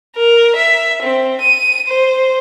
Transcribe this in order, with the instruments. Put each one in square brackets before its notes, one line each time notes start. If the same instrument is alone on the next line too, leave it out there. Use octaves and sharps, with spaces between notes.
[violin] A#4
E5
C4
D#7
C5